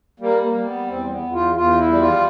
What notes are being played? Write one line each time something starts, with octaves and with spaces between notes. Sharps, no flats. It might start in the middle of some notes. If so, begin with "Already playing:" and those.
G3 A#3
A#3
G3
B3
E2 C4
B3
E2
F4
E2 F4
E4
G3
F4